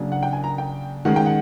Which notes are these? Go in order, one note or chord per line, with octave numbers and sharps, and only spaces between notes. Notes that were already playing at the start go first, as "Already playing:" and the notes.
Already playing: C#3 F#3 A#3 D4
F#5
G5
G#5
A#5
G5
D#3 G#3 C#4 F#5
G5
F#5